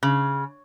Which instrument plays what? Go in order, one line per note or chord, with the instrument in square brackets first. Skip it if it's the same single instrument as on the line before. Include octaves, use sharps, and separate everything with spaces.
[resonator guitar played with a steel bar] C#3